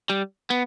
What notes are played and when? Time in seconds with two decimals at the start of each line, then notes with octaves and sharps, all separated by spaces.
0.10 G3
0.50 B3